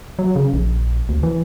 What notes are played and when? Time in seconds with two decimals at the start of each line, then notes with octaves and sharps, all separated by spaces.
0.19 F#3
0.36 C#3
0.54 A#1
1.09 D2
1.23 E3